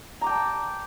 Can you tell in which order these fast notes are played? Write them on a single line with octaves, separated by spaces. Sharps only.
A#5 D6 G5 A5